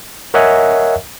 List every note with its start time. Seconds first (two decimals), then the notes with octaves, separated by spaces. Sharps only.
0.34 A#4 C#5 D#5 E5 F#5 G#5